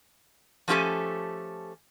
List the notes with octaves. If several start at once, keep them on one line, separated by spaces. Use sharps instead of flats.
F3 A3 C#4 G4 A4 G#5